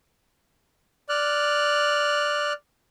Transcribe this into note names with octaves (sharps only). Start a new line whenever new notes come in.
D5 F6 F#6